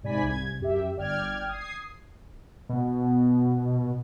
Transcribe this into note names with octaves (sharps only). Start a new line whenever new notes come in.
G#2 C3 D5 G#5 B5 B6
C2 G#6
F#2 G4 E5
G1 D5 G5 F6 G#6
D#6 G#6 C7
B2